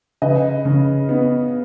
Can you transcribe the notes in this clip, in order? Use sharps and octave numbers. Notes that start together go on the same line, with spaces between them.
C#3 B4 D#5
C#3
B3